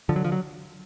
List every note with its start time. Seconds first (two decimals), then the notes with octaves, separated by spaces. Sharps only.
0.09 D3 F3
0.16 F#3
0.24 F3
0.32 F#3